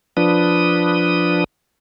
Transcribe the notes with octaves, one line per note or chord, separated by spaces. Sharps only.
F3 D4 B4 D#6